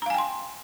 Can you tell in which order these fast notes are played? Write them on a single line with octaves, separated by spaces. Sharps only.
A#5 F5 G#5 G5 C6